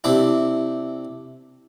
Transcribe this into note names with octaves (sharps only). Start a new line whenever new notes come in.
C3 D4 E4